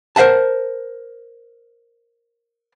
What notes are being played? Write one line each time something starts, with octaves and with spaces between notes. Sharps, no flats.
A#4 C5 E5 F#5 A5